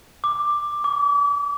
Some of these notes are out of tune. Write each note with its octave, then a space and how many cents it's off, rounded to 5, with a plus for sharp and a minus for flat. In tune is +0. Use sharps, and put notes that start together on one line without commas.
D6 +10
D6 -40